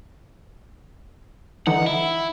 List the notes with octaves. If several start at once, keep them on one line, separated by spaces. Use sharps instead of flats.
D3 E3 D#4 F#5
E4